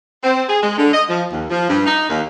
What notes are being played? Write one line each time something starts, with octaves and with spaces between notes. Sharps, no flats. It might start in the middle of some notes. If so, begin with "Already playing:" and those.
C4
G#4
G#3
D3
D#5
F3
D#2
F3
G2
D#4
D#2